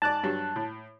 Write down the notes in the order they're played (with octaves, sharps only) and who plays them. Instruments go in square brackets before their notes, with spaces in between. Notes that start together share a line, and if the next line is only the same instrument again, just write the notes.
[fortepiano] G#2 D5 [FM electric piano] A5 F#6
[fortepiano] G2 F#3 G3
A2